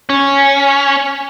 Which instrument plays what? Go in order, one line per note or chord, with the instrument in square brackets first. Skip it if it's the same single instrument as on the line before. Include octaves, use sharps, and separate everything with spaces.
[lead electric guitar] C#4